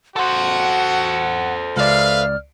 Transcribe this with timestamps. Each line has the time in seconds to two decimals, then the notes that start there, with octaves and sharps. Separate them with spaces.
0.16 F#4 A4 C5 F#5
1.76 C#2 B4 D5 E5 F5 F6